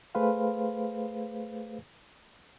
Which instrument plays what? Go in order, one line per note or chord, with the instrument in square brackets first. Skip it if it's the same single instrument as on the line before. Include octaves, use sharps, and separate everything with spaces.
[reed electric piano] A3 G#4 B4 C5 F5